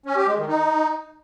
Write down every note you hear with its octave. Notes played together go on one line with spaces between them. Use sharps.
C#4
G4
G#3
D#3
D#4